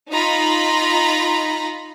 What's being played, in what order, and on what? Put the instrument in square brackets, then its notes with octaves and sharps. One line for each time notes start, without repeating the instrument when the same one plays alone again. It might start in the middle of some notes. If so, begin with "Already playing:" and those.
[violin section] D#4 F4 A#5 B5